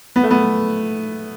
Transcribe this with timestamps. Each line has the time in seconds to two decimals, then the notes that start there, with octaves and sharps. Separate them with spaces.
0.16 B3
0.23 A3
0.31 B3